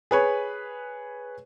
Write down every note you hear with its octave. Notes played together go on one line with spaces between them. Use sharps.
G#4 B4 C#5